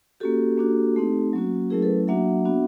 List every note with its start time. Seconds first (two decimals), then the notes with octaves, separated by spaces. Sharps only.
0.20 A#3 C#4 F#4 G4 A4
0.58 A#3 D4 F#4
0.96 A3 C4 D#4
1.33 F#3 A#3 C#4 F#4
1.70 F#3 A3 C#4 E4 G#4 A#4
1.82 A4 B4
2.07 F#3 A#3 D4 F#4 E5 F#5
2.45 B3 D4 F#4